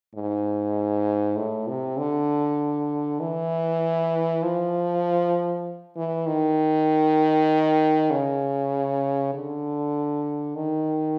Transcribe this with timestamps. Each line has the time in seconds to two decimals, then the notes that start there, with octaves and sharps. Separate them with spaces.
0.15 G#2
1.37 A2
1.68 C3
1.98 D3
3.20 E3
4.43 F3
5.96 E3
6.27 D#3
8.10 C#3
9.33 D3
10.56 D#3